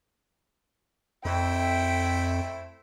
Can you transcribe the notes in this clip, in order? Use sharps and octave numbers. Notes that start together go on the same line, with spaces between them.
F2 A3 E4 C5 G5